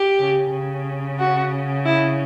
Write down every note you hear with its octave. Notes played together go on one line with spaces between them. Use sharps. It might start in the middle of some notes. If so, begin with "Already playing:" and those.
Already playing: G4
C#3 C#4
C#3 C#4
F#4
E4